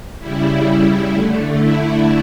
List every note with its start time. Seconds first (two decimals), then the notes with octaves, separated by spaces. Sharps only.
0.20 C#3 G3 E4
1.11 D3 A3
1.56 E4